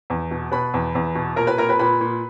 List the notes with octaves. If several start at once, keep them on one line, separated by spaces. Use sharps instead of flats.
E2
B2
B2 B4 B5
E2
E2
B2
A#2 A#4 A#5
B4 B5
A#2 A#4 A#5
B4 B5
A#2 B4 B5
A#2